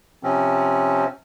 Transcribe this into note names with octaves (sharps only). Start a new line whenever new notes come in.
C3 F3 C4 C#4